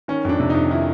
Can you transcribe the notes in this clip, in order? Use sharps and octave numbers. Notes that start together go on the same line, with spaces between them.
D#3 C#4
F2 D4
C3
F2 D#4
D#3 E4